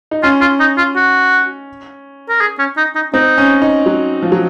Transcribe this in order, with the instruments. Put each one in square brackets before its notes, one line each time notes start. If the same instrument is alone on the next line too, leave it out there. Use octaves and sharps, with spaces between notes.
[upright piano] D#4
[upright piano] C#4 [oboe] F4
[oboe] F4
D#4
F4
F#4
A#4
G#4
C#4
D#4
D#4
[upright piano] C4 [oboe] D#4
[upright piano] C#4
D#4
F#3
F3
F#3